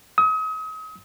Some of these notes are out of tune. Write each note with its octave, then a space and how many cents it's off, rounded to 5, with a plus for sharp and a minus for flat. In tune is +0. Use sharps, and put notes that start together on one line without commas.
D#6 +40